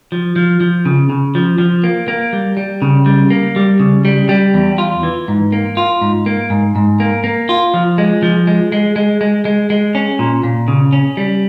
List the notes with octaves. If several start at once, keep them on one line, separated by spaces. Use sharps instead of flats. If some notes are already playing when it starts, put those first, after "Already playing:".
F3
F3
F3
C#3
C#3
F3
F3
A#3
A#3
G3
G3
C#3
G3
A#3
G3
C#3
G3
G3
E2
F4
E3
G#2
A#3
F4
G#2
A#3
G#2
G#2
A#3
A#3
F4
F3
G#3
F3
G#3
G#3
G#3
G#3
G#3
G#3
C#4
A#2
A#2
C#3
C#4
G3